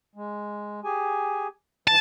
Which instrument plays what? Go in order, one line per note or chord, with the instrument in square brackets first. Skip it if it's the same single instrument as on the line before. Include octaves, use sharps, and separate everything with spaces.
[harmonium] G#3
G4 G#4 G#5
[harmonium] G2 E3 [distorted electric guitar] A5